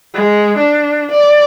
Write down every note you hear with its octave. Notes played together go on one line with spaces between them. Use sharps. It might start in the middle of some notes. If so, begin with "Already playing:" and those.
G#3
D4
D5